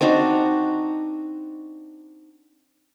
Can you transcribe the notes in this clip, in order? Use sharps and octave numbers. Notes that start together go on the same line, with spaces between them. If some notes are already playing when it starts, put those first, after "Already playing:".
C4 D4 D#4 F#4